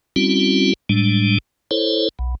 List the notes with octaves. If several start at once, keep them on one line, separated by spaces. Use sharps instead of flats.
G3 C4 C#4 E4 F#4
A2 G3 G#3 D4
E4 A4 C5 C#5
B1